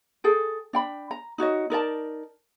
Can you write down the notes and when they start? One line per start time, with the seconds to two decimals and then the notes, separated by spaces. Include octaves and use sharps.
0.24 G#4 A4 G5
0.73 D4 G5 B5
1.11 A#5
1.38 D#4 F#4 C#5 D#5
1.70 D#4 A#4 D5 A5